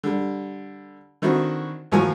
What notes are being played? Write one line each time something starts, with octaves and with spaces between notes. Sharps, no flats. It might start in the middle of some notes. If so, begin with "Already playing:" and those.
D3 G3
D3 D#3 C4 E4 F#4
D#2 A2 F3 F#4 A#4 G#5